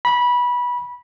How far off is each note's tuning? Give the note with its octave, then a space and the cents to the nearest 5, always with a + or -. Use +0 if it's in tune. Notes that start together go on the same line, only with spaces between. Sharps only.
B5 -20